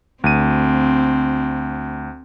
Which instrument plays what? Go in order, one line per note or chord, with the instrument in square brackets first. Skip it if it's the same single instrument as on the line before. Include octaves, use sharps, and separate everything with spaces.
[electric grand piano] D2 D#7 [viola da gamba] C4